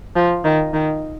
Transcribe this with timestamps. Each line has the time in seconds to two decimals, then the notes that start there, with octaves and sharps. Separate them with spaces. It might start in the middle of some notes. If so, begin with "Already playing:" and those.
0.16 F3
0.44 D#3
0.74 D#3